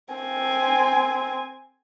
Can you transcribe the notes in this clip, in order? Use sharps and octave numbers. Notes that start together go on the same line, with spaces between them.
C4 G#5